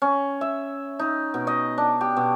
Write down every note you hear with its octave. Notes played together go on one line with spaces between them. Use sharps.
C#4
E5
D#4
B2
D#5
D4
G4
B2